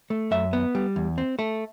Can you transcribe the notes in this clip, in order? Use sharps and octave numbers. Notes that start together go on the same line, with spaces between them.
A3
F#2 E5
B3
G3
E2
C4
A3